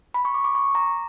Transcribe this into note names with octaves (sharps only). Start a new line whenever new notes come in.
B5
C#6
D6
D6
C#6
A#5